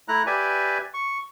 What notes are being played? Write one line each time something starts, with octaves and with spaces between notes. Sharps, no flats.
A3 E4 A#5 F#6
G4 B4 D5 E5 G#5
C#6